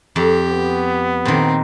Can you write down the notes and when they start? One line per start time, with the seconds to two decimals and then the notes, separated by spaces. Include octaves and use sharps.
0.16 F2 G4
0.50 B3
1.25 A#2 D#3 C4